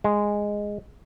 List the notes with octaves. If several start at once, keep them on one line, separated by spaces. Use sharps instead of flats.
G#3